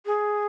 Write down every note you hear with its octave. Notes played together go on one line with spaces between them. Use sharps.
G#4